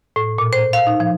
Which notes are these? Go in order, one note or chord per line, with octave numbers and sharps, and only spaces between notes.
A2
A#2
C5
F5
D#4
F3